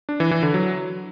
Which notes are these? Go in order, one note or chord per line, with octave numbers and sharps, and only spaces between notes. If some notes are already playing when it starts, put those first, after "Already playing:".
D4
E3
E3
D3
F#3